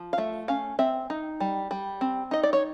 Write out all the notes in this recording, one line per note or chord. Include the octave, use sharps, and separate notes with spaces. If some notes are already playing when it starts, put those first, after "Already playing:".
Already playing: F3
F5
A3 E5
C#4 F5
C4 E5
D#4
G3
G3
C4
D#4 D#5
D5
C#5